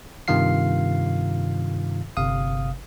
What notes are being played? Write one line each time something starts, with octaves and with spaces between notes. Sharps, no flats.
G2 C3 D#3 F4 F5 C7
G1 C3 F5 D#6